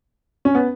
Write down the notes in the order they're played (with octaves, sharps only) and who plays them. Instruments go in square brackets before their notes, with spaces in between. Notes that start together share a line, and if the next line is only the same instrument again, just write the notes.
[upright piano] C#4
B3